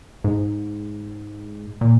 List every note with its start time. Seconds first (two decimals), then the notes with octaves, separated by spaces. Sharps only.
0.24 G#2
1.81 A#2